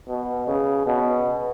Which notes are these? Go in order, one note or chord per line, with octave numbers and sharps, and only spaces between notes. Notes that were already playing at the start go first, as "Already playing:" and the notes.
B2
C#3
B2